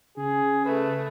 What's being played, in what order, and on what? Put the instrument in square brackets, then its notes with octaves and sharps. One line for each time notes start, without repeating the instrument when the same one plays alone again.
[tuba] C#3 [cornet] G#4
[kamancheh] A3 [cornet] B4